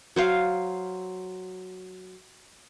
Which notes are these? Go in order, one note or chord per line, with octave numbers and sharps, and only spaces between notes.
F#3 C5 F5